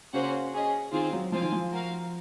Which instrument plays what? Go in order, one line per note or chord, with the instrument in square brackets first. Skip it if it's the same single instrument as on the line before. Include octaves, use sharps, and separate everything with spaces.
[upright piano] C#3 [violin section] A#3 C#4 F#4 C5 F#5
[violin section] C#4 G#4 D#5
[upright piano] D#3 [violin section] C4 F4 G#4 C5
[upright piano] F#3
[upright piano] F3 [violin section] C4 F4 C5 F5 G#5
[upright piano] D#3
F3
[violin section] F#4 A#4 F5